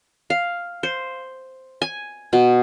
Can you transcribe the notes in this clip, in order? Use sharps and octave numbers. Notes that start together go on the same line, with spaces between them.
F5
C5
G#5
B2